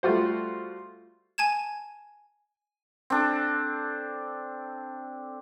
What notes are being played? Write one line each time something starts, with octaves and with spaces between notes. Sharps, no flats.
G3 A3 F4 F#4 C5
G#5 A5 G#6 E7
C4 D4 A4